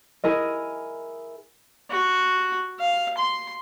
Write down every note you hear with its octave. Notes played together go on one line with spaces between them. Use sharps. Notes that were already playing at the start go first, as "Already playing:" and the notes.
E4 G#4 A#4 D#5
F#4
F5
C6